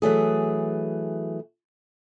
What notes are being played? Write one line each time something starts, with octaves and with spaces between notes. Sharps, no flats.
E3 F#3 A3 G#4